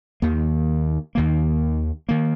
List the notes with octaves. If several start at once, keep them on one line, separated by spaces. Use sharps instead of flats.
D#2 D#3 A#3
D#2 D#3 A#3
D#3 A#3